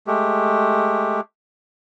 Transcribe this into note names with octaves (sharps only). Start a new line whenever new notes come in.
G#3 A3 G4